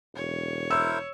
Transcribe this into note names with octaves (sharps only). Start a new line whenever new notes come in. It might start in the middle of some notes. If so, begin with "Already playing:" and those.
E1 C#5
E4 A#4 C5 E6